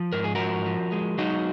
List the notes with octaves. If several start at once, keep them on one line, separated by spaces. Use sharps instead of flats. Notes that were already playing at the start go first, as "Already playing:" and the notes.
Already playing: F3
G#2 A#4
G#4
F3 F#4 A#4
F3
G#3
F#3 D#4 F#4